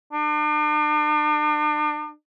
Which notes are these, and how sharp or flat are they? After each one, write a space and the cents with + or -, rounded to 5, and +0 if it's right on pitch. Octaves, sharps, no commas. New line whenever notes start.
D4 +40